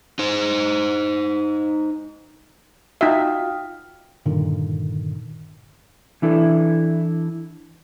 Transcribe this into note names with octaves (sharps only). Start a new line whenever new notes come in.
D#4 C5
D#4 F4 F#4 E5 F5 G5 D#6 F6
G2 A#2 D3 D#3
E3 D4 E4 A4